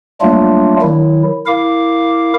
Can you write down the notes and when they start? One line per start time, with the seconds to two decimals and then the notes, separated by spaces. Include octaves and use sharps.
0.21 F#3 G3 A3 A#3 D4 F4
0.82 D#3 F#3 E4
1.47 E4 A#4 F5 D6